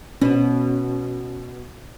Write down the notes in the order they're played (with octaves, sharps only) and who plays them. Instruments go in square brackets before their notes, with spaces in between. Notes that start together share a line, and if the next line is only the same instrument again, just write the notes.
[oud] B2 [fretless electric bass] C#4